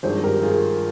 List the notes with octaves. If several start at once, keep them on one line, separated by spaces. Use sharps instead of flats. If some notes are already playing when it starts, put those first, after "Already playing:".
G#1 G2 F3 G#4 C5
G4 A#4
F4 G#4